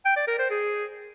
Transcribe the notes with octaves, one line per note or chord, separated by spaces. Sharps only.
G5
D5
A#4
C5
G#4